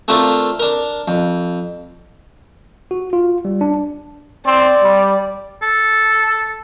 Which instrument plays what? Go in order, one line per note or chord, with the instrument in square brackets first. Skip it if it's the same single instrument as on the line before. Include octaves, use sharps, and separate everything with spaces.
[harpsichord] A3 C4 D4 F4 A4 A#4
D4 A#4
F2
[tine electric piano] F#4
F4
G3
D4
[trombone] C4 [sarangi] D5
[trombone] G3
[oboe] A4